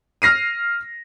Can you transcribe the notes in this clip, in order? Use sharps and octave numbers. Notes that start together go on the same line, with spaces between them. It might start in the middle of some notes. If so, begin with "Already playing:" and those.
F6 A#6 C7 D#7